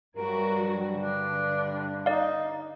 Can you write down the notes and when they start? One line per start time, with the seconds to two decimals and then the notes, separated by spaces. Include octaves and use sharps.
0.17 G2 F#3 G3 F#4 A#4
0.97 D3 D4
2.06 D#4 D5 F5